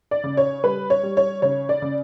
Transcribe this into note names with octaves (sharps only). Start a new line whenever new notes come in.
D5
C#3
C#5
G3 B4
C#5
G3
C#5
C#3 C#5
D5
C#3